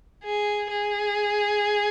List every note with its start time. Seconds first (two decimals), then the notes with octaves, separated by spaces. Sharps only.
0.24 G#4
0.70 G#4